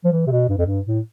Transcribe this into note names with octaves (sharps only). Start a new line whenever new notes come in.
F3
E3
C3
B2
G2
F2
G2
A2